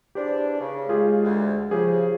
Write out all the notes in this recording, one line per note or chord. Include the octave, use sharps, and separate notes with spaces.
E2 D4 G4 C5
C#3
G#3 F4 G4 G#4
D2
C#3 F3 G4 G#4